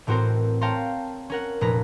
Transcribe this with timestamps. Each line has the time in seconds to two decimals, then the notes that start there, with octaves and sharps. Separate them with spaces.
0.07 A1 A2 C4 F#4 A#4 C5
0.61 C#5 F5 G5 A5 A#5 C6
1.30 C#4 A#4 F#5
1.61 F1 A#2 B4 A#5